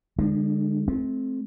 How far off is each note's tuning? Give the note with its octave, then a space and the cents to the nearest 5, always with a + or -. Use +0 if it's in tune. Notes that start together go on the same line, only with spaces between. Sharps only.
D3 +0 G#3 -30 D4 +45
A3 -35 C4 +0